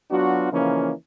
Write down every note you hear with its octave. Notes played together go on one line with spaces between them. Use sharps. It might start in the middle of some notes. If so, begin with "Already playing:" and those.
F#3 B3 D4 F4 F#4
C#3 E3 F3 A#3 C#4 D#4